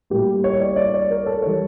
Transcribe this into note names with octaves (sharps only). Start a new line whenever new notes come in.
A2 G3 A#3 G4
C#5
D5
D5
C#5
A#4
A4
E3 G3 C#5